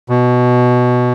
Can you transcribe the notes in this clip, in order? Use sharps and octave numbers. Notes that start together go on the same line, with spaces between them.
B2